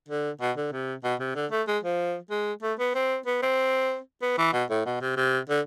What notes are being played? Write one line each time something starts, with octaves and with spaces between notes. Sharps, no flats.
D3
B2
D3
C3
B2
C3
D3
A3
G#3
F3
G#3
A3
B3
C4
B3
C4
B3
E3
B2
A2
B2
C3
C3
D3